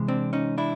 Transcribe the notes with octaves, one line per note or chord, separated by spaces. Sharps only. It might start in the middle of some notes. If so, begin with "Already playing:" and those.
Already playing: C3 E3 G#3
C4 D4
C#4 D#4
D4 E4